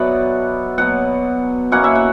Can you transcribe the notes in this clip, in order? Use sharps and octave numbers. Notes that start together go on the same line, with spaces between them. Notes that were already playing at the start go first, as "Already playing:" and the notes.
Already playing: B2 F#3 B3 B4 D5 E5 F#5
B2 F#3 B3 F#5
B2 A#3 C#4 E4 F#5
E5
F#5